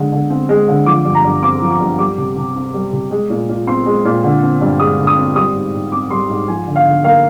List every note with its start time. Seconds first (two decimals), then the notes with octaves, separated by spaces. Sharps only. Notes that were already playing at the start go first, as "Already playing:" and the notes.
Already playing: D3 G#3
0.12 D3
0.30 C4
0.49 G#3
0.68 D3
0.86 F3 D6
1.05 G2
1.15 A#5
1.24 G2
1.42 C4 D6
1.61 F3
1.71 D6
1.80 G2
1.99 G3 D6
2.18 C3
2.36 C3
2.55 C4
2.74 G3
2.93 C3
3.11 G#3
3.30 A#2
3.49 A#2
3.67 C4 C6
3.86 G#3
4.05 A#2
4.24 D3
4.43 C4
4.61 G2
4.79 G#3 D#6
4.98 D3
5.07 D#6
5.17 C4
5.36 G3 D#6
5.54 G#2
5.73 G#2
5.92 C4 D6
6.10 G3 C6
6.29 G#2
6.48 F3 G#5
6.67 D3
6.76 F5
6.85 D3
7.04 A#3 F5